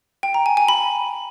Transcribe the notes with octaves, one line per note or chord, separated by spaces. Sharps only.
G5
A#5
G#5
G#5
B5